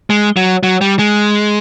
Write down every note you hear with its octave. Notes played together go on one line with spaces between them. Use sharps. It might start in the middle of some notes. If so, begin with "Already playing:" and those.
G#3
F#3
F#3
G3
G#3